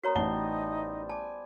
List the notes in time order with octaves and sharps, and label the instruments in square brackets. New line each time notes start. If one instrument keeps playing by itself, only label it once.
[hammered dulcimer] B3 C5 [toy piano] F#4 C#5 A#5 [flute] A#4
[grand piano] A1 A5 G7 [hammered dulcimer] G3 [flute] D#4 [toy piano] F#5
[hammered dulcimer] D5 G#5 [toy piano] A5